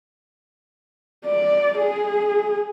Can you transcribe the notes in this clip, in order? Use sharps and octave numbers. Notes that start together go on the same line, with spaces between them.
D5
G#4